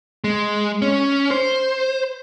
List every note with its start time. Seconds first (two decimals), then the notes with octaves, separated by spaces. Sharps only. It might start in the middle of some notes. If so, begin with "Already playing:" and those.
0.24 G#3
0.82 C#4
1.31 C5